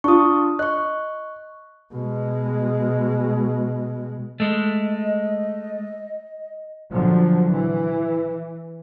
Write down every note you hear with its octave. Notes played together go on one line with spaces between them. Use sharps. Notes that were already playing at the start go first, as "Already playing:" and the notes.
D4 F4 C#6 D#6
D#5 C#6 F#6
B2 G#3
G#3 A3 D#5
A#2 D3 F3 F#3
E3